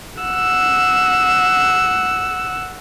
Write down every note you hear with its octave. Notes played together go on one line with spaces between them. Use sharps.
F#5 E6